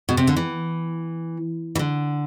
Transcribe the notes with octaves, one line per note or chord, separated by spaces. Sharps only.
B2
C3
D3
E3
E3
D3